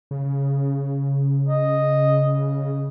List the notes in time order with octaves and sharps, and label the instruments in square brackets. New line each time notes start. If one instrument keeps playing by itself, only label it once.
[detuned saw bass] C#3
[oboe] D#5